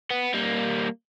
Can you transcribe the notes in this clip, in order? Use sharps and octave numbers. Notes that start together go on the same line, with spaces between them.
B3
G3 A#3